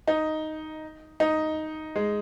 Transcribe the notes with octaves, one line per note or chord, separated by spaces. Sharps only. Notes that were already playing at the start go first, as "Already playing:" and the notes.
D#4
D#4
G#3